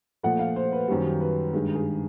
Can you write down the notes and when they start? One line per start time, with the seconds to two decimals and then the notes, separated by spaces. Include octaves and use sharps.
0.23 A#2 F3 A3 F#5
0.39 F5
0.56 C5
0.72 B4
0.88 F#2 D#3 G3 C5
1.20 B4
1.53 G2 D#3 G#3
1.75 G#4